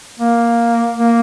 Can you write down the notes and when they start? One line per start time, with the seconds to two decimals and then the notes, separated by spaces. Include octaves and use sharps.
0.19 A#3
0.98 A#3